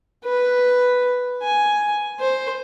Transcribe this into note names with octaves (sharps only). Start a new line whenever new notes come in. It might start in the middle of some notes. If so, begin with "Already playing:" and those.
B4
G#5
C5